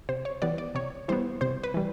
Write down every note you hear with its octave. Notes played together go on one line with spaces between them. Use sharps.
C3 C5
C#5
E3 G3 B3 D5
D5
C3 C#5
E3 G3 B3 C5
C3 C5
B4
E3 G3